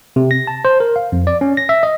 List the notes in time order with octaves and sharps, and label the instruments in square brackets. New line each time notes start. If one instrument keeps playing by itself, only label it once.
[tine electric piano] C3
A#6
A5
C5
A#4
F5
F2
D5
C#4
A#6
E5
D#5